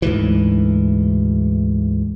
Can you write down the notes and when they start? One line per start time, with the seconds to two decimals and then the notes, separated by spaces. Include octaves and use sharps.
0.02 D2 G#2 E3